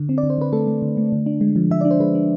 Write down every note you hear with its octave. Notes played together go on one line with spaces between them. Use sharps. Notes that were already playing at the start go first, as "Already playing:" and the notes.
Already playing: D3
C4
D5
D3
C5
D3 B4
A3 A4
A3
D3
A3
D3
D4
G#3
F3
F3 E5
D4 D5
C5
G#3 B4
D4